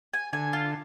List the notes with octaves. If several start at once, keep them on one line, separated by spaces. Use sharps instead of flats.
G#5
D3 G#5
F4